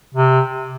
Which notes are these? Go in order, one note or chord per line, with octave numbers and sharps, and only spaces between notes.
C3